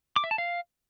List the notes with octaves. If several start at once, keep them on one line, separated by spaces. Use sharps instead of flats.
D6
E5
A5
F5